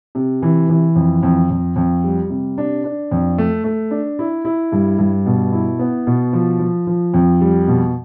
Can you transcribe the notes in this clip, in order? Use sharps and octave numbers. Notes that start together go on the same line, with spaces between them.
C3
E3
E3
F2
F2
F2
F2
G3
C3
D4
D4
F2
A3
A3
D4
E4
E4
G2
G2
B2
E4
B3
B2
F3
F3
F3
F2
G3
B2